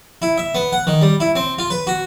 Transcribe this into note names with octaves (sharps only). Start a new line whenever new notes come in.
E4
E5
B3
F#5
D#3
G3
E4
C4
F4
B4
F#4